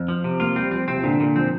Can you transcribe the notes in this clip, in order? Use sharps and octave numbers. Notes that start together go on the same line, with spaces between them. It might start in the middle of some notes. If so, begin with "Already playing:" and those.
Already playing: F2
F3 C4
C3
A#3 F4
G3 C4
F3 C4
C3 C4
F3
A#2 D3
A#2
F3 C4